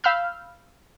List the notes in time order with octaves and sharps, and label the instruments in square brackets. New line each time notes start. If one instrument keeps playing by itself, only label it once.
[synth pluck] F5 B5 E6 F6 G6